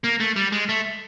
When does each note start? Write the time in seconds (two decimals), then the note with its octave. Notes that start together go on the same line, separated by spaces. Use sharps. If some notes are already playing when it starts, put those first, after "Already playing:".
0.04 A#3
0.20 A3
0.36 G3
0.52 G#3
0.69 A3